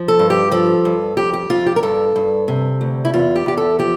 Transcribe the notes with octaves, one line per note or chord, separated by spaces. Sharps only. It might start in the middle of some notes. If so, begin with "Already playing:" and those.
Already playing: F3
A4
G2
G4
F3 A4
G2
F2 G4
G4
F2 F4
G4
A#4
G2 A4
G2
C3
D2
E4
E2 F4
G4
E2 G4
A4
F3 G4